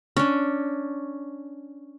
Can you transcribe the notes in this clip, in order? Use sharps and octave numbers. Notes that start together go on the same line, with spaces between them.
C#4 D4